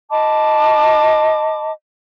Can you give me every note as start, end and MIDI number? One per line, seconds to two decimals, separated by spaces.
0.10 1.71 75
0.10 1.71 81
0.10 1.71 83
0.10 1.71 86